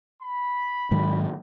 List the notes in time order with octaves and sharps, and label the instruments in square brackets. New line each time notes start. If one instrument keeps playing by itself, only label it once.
[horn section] B5
[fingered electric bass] G#2 D#3 F#3